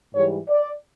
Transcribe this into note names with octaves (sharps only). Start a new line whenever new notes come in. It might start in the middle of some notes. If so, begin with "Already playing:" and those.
G#2 E3 G3 C#5
D5